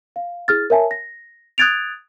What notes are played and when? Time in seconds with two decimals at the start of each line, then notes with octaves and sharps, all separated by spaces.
0.16 F5
0.48 E4 G#4 F6 A6
0.70 A#4 C#5 E5 G#5 A5
0.91 A#6
1.58 D#6 F#6 G#6 A6 D7 F7